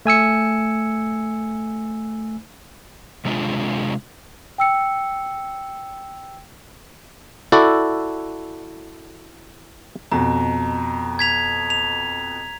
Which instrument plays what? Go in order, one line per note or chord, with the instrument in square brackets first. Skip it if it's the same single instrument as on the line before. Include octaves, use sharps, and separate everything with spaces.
[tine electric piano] A3 G#5 E6 C#7
[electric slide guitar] C3 G#3 D4 F4
[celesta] G5 E6 C#7
[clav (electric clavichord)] E4 F#4 A4 D5
[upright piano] F2 B2 [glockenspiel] A#5
[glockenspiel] G#6 B6 F7
F7